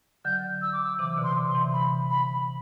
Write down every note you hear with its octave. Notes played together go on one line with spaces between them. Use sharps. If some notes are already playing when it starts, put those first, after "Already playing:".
D3 F#3 G6
E6
D6
E6
C3 E3 D6
B2 D3
C6
C3
C6
C3 E3
B5
B5